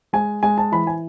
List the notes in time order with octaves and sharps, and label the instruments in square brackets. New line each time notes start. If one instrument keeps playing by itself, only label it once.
[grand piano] G#3 G#5
G#3 G#5
A5
E3 B5
G#5